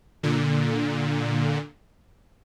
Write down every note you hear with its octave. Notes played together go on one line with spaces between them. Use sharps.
A#2 D3